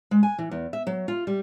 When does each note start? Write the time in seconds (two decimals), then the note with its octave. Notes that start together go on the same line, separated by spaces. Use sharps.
0.11 G#3
0.23 G#5
0.38 E3
0.51 E2
0.73 E5
0.87 F#3
1.08 F4
1.27 G3